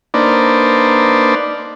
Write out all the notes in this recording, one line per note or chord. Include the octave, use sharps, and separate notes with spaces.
A#3 D4 D#4 B4 C5 D5